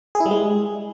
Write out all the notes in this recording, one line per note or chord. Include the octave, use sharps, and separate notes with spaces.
G#4
E4
G3
G#3